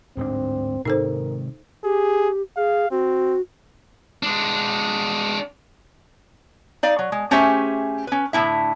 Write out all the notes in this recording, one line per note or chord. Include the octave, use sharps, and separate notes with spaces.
D1 G#2 C4 D4
G#2 C3 D#3 D#4 A4 A#4 C5
G4 G#4
G#4 F5
C4 F#4
G#3 D4
D#4 D5 F5
F#3
G#3
A3 C#4 G4 G#4 C5 E5
C#4 B4
A2 D3 C#4 E4 E5